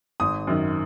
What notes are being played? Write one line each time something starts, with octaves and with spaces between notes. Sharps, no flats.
G#1 D#6
F#2 D#3